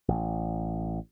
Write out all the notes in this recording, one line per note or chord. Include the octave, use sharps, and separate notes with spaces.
A1